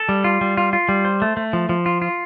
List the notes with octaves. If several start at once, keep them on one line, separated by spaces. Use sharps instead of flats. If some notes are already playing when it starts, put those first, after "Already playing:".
Already playing: A4
G3
F4
G3
F4
F4
G3
C5
A3
A3
F3
F3
F4
F4